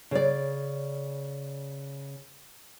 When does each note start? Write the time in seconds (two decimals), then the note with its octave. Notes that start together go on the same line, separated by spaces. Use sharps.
0.11 C#3 D5